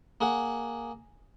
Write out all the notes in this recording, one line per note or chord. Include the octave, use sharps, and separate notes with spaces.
A#3 G#4 F#5